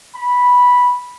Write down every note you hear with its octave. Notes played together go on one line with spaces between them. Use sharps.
B5